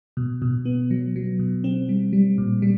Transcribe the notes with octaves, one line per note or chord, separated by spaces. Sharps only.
B2
B2
B3
F#3
F#3
B2
C4
G3
G3
A#2
G3